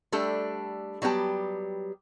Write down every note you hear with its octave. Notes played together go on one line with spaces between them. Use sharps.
G3 A3 D4 A4
F#3 G3 B3 G4 A5